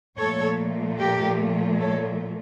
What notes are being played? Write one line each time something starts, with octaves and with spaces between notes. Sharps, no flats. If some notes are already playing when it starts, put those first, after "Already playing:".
A#2 F3 A3 A4 C#5
G4 A#4
A4 C#5